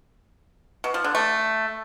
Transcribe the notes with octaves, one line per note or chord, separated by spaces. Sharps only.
B2
F3
D3
A3